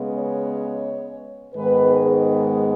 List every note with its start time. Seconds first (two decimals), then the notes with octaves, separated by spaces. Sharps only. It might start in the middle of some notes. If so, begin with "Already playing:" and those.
Already playing: C#3 G#3 B3
0.13 C#5
1.54 G#2 D#3 G#3 B3 B4
2.01 G#4